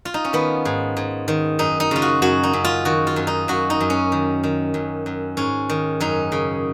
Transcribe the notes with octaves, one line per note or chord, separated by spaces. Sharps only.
F4
D#4
C#4
D#3 B3
G#2
G#2
D#3
F#2 D#4
D#4
C#3 F4
F#4
F#2 F#4
D#4
F#2
F4
D#3 F#4
F4
F#2
D#4
F#2 F#4
D#4
F#2
C#4
D#3
D#3
F#2
F#2
G#2 C#4
D#3
F#2 D#4
C#3